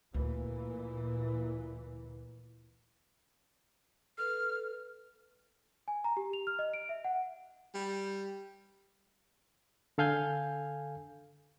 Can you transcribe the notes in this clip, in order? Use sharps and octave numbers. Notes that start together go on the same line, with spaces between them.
D2 A#2 E3
A4 B4 F6
G#5
A#5
G4
F7
F6
D#5
D7
E5
F#5
G3
D3 A4 F5 G#5 G6